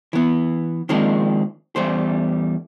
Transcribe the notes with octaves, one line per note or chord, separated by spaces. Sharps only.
E3 B3
D#3 F3 G#3 A#3 C4 D4
E2 G3 A3 C5